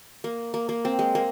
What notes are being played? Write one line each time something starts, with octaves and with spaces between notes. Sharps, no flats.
A#3
A#3
A#3
C4
G#3
A#3